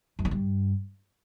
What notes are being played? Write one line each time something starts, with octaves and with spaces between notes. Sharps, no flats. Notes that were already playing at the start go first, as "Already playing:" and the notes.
F#2
D#3
G2